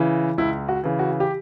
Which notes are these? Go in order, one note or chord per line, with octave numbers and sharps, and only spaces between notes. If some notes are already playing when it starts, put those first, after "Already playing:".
Already playing: C#3 E3
C#2 E4
F#4
C#3 E3
F#4
G4